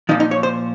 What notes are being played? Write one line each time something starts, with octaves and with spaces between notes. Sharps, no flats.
A#2 F3 D#4
D#4
C#5
C5